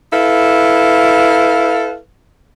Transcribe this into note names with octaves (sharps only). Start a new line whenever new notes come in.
E4 A4 B4 F5